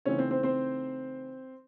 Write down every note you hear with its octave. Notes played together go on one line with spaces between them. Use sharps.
C#3 E3 A3 C4 C#4 D#4 C#5
C4 C5
C4 C5
C4 C5